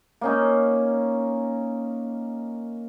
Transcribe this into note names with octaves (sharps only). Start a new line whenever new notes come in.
A#3 C#4 D#4